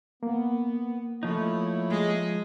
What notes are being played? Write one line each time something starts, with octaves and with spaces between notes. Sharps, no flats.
A#3 B3
F3 A3 D#4 E4 C#5
G#3